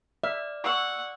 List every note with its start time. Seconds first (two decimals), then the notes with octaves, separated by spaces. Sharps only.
0.24 D5 E5 F6
0.64 F#5 C#6 E6